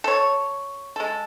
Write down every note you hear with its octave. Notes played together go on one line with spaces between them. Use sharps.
A4 C#5
G#3 A4